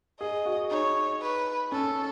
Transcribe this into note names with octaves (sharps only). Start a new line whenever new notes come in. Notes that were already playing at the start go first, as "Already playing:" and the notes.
G#4 D#5
F#4
D#4 C#5
B4
C#4 A4